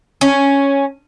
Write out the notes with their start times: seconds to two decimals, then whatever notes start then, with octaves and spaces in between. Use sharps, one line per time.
0.21 C#4